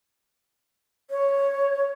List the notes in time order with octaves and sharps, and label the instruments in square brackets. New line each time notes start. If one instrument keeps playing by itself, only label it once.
[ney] C#5